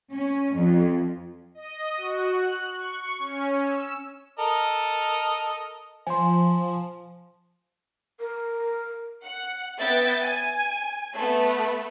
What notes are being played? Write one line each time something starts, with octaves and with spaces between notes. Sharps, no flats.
C#4
F2
D#5
F#4
F#6
C#6
C#4
E6
A4 A#4 D#5
F3 G#5 C6
A#4
F#5
B3 E5 G5 A6
G#5
A3 B3